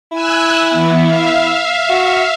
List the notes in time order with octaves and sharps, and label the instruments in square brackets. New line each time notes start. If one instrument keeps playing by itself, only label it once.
[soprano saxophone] E4 [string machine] G#5 E6 F#6
[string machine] E3 B3
E5 F5
[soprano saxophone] F#4